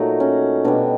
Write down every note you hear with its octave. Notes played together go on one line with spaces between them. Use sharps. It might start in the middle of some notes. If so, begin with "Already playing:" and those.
Already playing: A#2 F#3 A3 D#4
C#4
B2 G3 D4